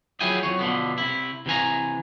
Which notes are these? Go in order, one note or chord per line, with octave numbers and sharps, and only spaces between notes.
F3 F#3 E4 G#4 G5 G#5
F2 F#3 C#5
B2 D3 F3 B3
C3 E4
C3 E3 G#5 A#5